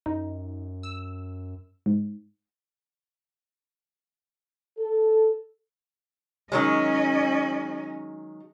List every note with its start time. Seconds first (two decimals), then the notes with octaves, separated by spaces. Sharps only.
0.06 F#2 D#4
0.83 E6
1.86 G#2
4.78 A4
6.52 D#3 F#3 G#3 C#4 D#5